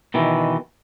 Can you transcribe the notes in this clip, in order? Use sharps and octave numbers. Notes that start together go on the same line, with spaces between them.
B2 D#3 E3